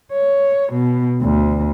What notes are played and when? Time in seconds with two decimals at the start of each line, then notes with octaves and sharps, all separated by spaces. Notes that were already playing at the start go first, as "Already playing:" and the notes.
0.12 C#5
0.73 B2
1.22 D2